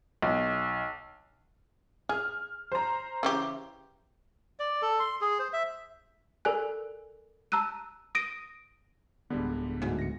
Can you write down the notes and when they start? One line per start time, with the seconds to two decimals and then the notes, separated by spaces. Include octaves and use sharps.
0.22 B1
2.09 G#4 F6
2.72 C5 A#5
3.23 C#3 E3 G4
4.59 D5
4.82 A4
5.00 C6
5.21 G#4
5.39 C5
5.53 E5
6.45 A4 A#4 D5 G#5 F#6
7.52 A5 A#5 E6 F#6 D#7
8.15 D#6 A#6 D7 D#7
9.30 D1 D3 G3 G#3 B3
9.82 D2 G#2
9.99 A#6 C#7